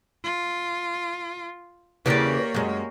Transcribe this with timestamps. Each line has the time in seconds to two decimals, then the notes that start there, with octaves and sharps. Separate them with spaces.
0.24 F4
2.06 E2 C#3 E3 A#3 G4 A#4 C#5 D5
2.54 F#2 G#3